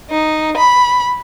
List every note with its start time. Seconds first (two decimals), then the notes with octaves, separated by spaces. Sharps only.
0.10 D#4
0.57 B5